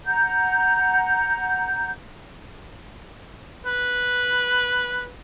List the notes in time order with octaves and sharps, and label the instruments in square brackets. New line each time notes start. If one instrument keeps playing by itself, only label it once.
[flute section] F#5 A#5 G6
[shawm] B4